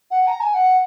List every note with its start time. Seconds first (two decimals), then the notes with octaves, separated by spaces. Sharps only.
0.11 F#5
0.27 A#5
0.40 G#5
0.54 F#5